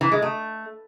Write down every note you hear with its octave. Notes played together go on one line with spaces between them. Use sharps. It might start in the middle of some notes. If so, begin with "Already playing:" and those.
E3
G#3
A3